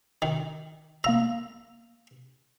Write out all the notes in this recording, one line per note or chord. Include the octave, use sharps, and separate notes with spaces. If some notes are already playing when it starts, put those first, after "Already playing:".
D#3
A#3 F5 A#5 E6